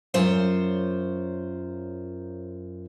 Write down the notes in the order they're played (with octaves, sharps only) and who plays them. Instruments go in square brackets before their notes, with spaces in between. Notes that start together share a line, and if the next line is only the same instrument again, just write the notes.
[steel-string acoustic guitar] F#2 F4 C5 C#5